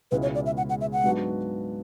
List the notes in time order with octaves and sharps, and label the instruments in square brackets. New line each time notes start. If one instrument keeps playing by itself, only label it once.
[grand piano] C#2 B2 G#3 C#4 E4 [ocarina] B4
[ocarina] C#5
D5
E5
F#5
F#5
E5
F#5
[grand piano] G#2 F#3 B3 D4 F#4